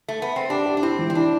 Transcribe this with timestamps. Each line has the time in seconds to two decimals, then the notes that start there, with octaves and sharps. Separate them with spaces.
0.08 A3
0.22 B3
0.36 C4
0.50 D4 G4
0.66 G4
0.77 D4
0.82 C4 E4
0.99 E3
1.10 C4
1.15 D4 E4